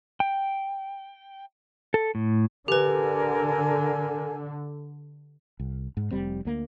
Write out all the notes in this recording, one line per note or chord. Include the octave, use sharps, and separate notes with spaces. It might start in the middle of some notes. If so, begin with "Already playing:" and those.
G5
A4
A2
D3 G4 A#4 B4 G#5
C2
G#2
F1 G3 C4
D2 A#3